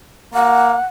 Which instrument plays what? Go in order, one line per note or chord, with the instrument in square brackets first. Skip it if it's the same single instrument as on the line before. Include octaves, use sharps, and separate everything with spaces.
[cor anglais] A#3 [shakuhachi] F#5